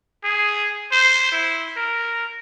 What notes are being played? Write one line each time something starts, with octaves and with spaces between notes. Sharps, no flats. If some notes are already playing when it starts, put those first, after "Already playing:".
G#4
C5
E4
A#4